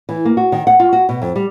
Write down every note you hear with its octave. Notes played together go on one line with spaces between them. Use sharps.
E3
A#3
F#4
D#3
F#5
F4
F#4
B2
F2
G3